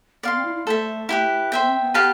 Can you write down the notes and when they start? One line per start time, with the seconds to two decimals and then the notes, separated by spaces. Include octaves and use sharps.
0.23 B3 D5 F5 C6
0.35 C4
0.44 E4
0.55 E4
0.67 A3 A4 C5 E5
1.09 E4 G4 B4
1.52 B3 C5 E5 G5
1.66 C4
1.81 B3
1.94 G4 B4 F5 A5